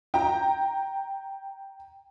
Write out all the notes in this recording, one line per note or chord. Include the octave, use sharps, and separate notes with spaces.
G5 A#5